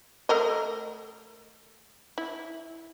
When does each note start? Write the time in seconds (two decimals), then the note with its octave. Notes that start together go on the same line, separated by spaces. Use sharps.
0.29 A3 A#4 D#5
2.18 E4